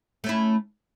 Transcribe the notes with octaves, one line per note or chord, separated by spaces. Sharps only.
A3 C#4 E4